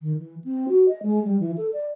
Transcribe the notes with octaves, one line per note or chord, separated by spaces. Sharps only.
D#3
E3
C4
F#4
D#5
G#3
G3
E3
A4
D5